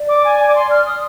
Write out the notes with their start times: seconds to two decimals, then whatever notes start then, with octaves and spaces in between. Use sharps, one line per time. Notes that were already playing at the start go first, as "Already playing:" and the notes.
Already playing: D5
0.09 D6
0.25 G#5
0.40 G#5
0.48 D6
0.55 C6
0.70 F6
0.86 D#6